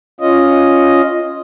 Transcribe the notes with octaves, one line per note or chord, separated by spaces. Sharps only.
C#4 F4 D#5